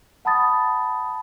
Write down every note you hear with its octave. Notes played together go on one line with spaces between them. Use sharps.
F#5 A5 B5 D#6 A6